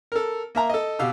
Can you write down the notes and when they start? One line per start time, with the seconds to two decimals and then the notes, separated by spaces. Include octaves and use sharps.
0.12 A4 A#4
0.55 A#3 E5 A#5
0.70 A4 D#5
0.99 B2 G4 F5 E6